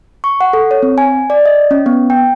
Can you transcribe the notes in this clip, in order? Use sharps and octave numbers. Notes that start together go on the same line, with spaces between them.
C#6
F#5
A4
C#5
C4
G#5
D5
D#5
C#4
B3
G5